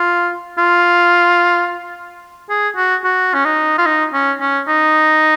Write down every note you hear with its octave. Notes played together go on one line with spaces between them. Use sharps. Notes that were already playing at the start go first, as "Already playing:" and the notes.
Already playing: F4
F4
G#4
F#4
F#4
C#4
D#4
F4
D#4
C#4
C#4
D#4